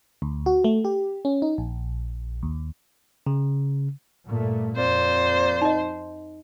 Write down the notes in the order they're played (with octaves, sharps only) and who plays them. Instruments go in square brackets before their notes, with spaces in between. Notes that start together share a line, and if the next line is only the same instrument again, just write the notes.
[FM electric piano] D2
F#4
A3
G4
C#4
D#4
A#1
D#2
[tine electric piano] C#3
[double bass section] G2 A#2 A3
[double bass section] F2 C4 [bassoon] A#2 [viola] C5
[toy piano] D#4 D#5